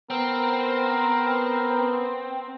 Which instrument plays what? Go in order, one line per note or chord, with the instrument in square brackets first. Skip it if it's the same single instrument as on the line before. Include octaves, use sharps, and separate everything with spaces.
[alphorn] B3 [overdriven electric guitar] C4 [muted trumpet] A#4